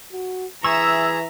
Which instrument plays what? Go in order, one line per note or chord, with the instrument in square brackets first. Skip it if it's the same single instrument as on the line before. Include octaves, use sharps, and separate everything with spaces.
[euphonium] F#4
[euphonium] E3 [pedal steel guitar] G#4 C#6 [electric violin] E5 A#5 [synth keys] E6